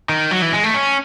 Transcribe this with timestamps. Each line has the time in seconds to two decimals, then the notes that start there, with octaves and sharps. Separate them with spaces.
0.09 D#3
0.31 F#3
0.42 E3
0.53 G#3
0.64 A3
0.74 C#4